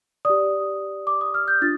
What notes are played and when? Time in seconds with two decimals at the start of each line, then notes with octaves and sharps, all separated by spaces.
0.25 G4 D5 D#6
1.07 D6
1.21 D#6
1.34 F6
1.48 G6
1.62 D4 F4 A6